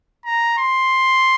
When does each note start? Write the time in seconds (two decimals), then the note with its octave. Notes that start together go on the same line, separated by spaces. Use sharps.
0.26 A#5
0.58 C6